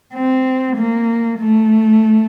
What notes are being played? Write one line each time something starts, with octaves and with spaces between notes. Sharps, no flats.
C4
A#3
A3